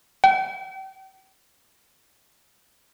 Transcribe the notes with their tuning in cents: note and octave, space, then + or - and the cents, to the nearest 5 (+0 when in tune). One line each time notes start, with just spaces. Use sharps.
G5 -40